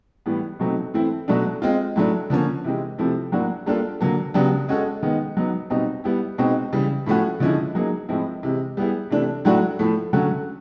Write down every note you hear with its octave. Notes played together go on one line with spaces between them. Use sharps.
A2 E3 G3 B3
B2 F#3 A3 C4 D#4
E3 A3 C4 E4
B2 F#3 A3 D4
G#3 C4 F4
A2 F#3 A3 D4
D3 F3 A#3 C#4
C3 E3 G#3 C4
C3 F3 A3 C4 E4
A2 F#3 A#3 D4 F#4
G3 A#3 D4 F4 A4
D3 F#3 A#3
C#3 F#3 B3 D4 G4
G#3 C#4 F#4 A4
D#3 G#3 B3
F#3 B3 D#4
B2 G3 C4 D#4
G3 B3 E4 G4
B2 G#3 C4 D#4
C#3 E3 G3
A2 F3 A3 C#4 F#4
D3 F3 G#3 C#4 E4
F#3 A#3 D#4 G#4
A2 F3 G#3 C4 E4
C3 E3 G#3
G3 B3 E4 G#4
C3 E3 A3 D4
A2 F#3 A3 D4 F#4
A2 F3 A3
D3 F#3 A3 C#4 F#4